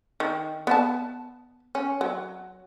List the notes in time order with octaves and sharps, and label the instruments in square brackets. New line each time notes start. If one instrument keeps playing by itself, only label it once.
[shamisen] D#3
B3 E5 A5
C#4
F#3